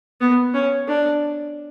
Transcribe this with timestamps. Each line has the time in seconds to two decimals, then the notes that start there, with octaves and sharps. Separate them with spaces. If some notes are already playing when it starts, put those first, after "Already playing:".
0.21 B3
0.54 C#4
0.88 D4